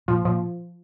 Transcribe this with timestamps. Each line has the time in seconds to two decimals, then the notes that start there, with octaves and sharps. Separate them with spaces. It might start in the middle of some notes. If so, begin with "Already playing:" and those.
0.08 A#2 F3
0.25 A#2 F3